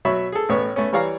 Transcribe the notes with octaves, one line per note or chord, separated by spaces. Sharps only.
B2 F#3 C#5 E5 B5
G#4 A4
A1 A2 B3 C#5
A3 B3 C#4
E3 G3 C#5 D5 F5 A#5